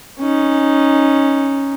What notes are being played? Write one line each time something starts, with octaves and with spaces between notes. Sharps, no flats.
C#4 D#4